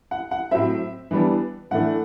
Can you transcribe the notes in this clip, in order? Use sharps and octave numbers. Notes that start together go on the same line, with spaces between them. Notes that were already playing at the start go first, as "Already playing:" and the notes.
F#5
F#5
A2 F#3 C4 E5
E3 G3 B3 D4
A2 E3 A3 D4 F#5